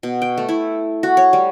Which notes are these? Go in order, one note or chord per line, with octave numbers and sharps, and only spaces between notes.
B2
G5
A3
E4
F#4
C#5
G3